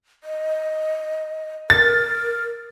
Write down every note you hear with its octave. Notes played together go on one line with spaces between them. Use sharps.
D#5
A#4 A6